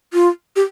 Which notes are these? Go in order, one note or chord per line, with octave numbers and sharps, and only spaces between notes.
F4
G4